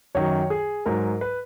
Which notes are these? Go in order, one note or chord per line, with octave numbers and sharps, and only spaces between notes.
F#2 D#3 F#3 C#5
G#4
G#2 F#3 A#4
B4